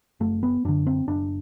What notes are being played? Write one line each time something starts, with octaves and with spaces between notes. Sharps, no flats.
F#1 A3
B3
F#2 D3 D4
C4
F#1 D4